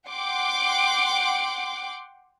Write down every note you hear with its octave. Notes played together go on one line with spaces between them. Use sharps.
F#5 G5 C6 D6